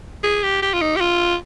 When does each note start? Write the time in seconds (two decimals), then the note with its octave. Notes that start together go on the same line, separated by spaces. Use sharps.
0.23 G#4
0.43 G4
0.62 G4
0.73 F4
0.81 D#4
0.96 G4
1.01 F4